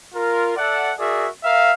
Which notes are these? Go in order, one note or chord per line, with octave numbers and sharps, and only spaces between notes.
F4 A#4
A4 D5 E5 F#5
F#4 G#4 A#4 D5 E5
A#4 E5 F5